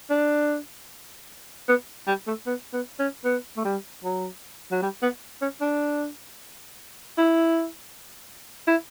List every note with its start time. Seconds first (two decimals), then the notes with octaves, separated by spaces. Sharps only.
0.10 D4
1.68 B3
2.07 G3
2.27 A3
2.46 B3
2.73 B3
2.99 C#4
3.25 B3
3.57 A3
3.65 G3
4.04 F#3
4.71 F#3
4.82 G3
5.02 B3
5.42 C#4
5.61 D4
7.18 E4
8.67 E4